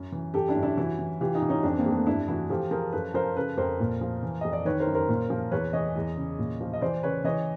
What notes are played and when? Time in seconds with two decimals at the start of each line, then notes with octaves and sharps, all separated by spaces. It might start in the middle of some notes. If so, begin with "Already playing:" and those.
Already playing: F#2
0.12 E3
0.34 F#2 G4 A4
0.48 D4 E4
0.56 F#2
0.63 D4 E4
0.77 E3 E4 F#4
0.99 E3
1.21 E3 F4 G4
1.35 D#4 F4
1.42 E3
1.49 C#4 D#4
1.63 F2 C4 D4
1.78 A#3 C4
1.86 F2
1.92 A3 B3
2.06 G2 D4 E4
2.28 E3 E4 F#4
2.50 F3 G4 A4
2.71 F3 G#4 A#4
2.93 F#2 A4 B4
3.14 F3 A#4 C5
3.36 C#3 A4 B4
3.57 F2 A#4 C5
3.80 A#2
4.01 F3
4.23 E3
4.41 F2 D#5
4.53 D5
4.65 D#3 B4 C#5
4.80 A#4 C5
4.87 F#2
4.94 A#4 C5
5.08 A#2
5.30 F3
5.52 E2 B4 C#5
5.73 E3 C#5 D#5
5.96 E2
6.17 C#3
6.39 A#2
6.61 F3
6.73 D#5
6.81 E3 C5 D5
7.03 C#3 B4 C#5
7.24 E3 C#5 D#5